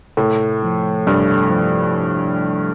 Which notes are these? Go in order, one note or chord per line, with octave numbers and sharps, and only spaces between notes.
A2 C3
F3 A3
G2 C3
F3 A3